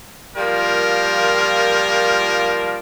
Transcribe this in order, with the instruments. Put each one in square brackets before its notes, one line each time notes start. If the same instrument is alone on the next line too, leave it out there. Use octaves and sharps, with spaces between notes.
[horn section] F3 G3 A#3 F4 A#4